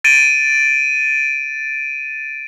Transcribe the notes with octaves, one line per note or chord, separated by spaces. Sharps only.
A6 D7 D#7